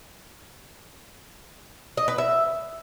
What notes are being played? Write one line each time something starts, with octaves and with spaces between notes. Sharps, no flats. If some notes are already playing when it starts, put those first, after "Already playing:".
D#5
B4
E5